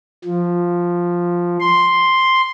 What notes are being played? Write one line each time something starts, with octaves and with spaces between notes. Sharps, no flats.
F3
C6